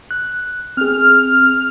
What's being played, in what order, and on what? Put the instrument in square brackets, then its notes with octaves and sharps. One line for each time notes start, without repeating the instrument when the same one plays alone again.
[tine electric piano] F#6
[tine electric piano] C4 G#4 [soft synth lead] F6